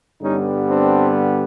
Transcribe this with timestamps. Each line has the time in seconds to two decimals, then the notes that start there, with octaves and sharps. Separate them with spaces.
0.22 G2 D3 G3 B3 C#4 D#4
0.68 C4 D4